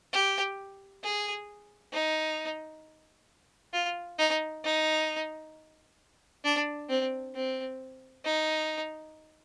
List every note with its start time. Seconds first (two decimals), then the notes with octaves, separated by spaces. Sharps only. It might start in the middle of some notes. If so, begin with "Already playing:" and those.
0.13 G4
1.03 G#4
1.93 D#4
3.73 F4
4.19 D#4
4.64 D#4
6.44 D4
6.90 C4
7.35 C4
8.25 D#4